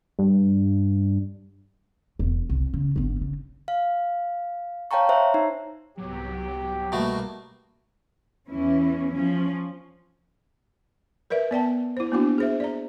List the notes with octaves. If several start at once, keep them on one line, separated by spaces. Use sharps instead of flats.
G2
E1
C2
C#3
G1 G#2
C#3
F5
C#5 F5 G5 A5 A#5 C#6
C5 C#5 E5 A#5
D#4
C2 G#2 F#3 B3 G4
B2 G3 A3 A#3 F#4
E2 E3 C#4 E4
F3 C#4
A#4 B4 D5 E5
B3 D5 G5 A5
E4 C5
A#3 B3 D4 E4 F#4
G#4 C5 E5
D5 A#5